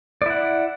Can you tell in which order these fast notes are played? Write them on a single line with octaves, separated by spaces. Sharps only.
D5 E4 F#5